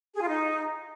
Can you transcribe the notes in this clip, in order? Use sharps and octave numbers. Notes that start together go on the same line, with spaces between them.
G#4
F4
D#4